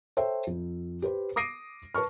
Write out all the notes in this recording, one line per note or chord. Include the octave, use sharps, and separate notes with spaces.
A4 C5 C#5 E5 G5
F2
G4 B4 C5
D6 D#6 A#6 C7 D7 D#7
B4 A5 C#6 F6